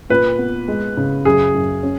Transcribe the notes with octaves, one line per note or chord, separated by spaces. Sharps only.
A#2 B4
B3
G#3
C#3
F#2 G#4
F#2
C#4